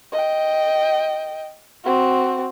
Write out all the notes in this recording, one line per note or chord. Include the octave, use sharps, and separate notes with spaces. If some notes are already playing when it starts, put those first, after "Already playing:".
D#5 G5
C4 F#4